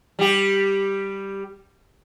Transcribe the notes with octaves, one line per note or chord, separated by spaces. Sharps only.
G3 G4